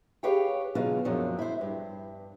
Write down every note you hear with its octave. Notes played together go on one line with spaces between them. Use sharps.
G4 G#4 B4 C#5 F5 G5
B2 D3 F#3 F4 G#4
F#2 A#2 F3 F#3 D4
E4 C5
G2